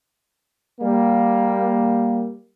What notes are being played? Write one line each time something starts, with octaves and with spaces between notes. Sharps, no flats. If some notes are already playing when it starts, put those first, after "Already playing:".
G3 A#3